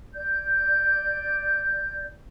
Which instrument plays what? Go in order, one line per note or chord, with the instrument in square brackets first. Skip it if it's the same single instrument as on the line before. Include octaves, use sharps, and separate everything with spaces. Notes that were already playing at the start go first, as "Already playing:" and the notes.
[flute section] D5 G6